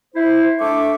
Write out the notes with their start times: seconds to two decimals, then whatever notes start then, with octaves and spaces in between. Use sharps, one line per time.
0.15 E4 C5
0.59 A3 D4 E5 C#6 D6